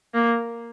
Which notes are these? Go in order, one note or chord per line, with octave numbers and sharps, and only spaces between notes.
A#3